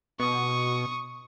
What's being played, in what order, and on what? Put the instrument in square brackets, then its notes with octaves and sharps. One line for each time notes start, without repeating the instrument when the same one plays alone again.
[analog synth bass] B2 [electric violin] C#6 D#6